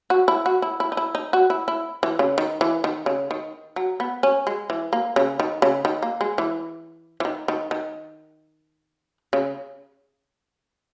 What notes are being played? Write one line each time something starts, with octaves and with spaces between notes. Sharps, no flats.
F#4
E4
F#4
E4
E4
D#4
E4
D#4
F#4
E4
E4
E3
C#3
D#3
E3
D#3
C#3
D#3
F#3
B3
C#4
G#3
E3
A#3
C#3
D#3
C#3
D#3
A#3
G#3
E3
E3
D#3
D#3
D#3
C#3